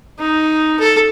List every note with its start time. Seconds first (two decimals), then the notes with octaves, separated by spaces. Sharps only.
0.19 D#4
0.79 A4